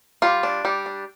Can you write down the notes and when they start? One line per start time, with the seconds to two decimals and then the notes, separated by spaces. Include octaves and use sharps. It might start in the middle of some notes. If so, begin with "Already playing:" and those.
0.22 G3 F4
0.43 D4
0.65 G3
0.86 D4